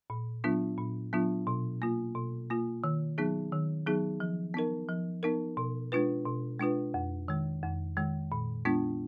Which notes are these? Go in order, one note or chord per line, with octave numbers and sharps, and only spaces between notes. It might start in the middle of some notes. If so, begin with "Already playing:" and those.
A#2
F#3 B3 D4 F4
A#2
F#3 B3 D4 F4
B2
A#3 F4
B2
A#3 F4
D#3
F#3 B3 D#4 G#4
D#3
F#3 B3 D#4 G#4
F3
B3 D#4 A#4
F3
B3 D#4 A#4
B2
G#3 D4 F4 B4
B2
G#3 D4 F4 B4
F2
D#3 G#3
F2
D#3 G#3
A#2
G#3 B3 D4 F4